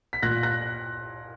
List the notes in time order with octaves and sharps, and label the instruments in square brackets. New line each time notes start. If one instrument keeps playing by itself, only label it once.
[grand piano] B6
A#2 F#6 A#6
F#6 A#6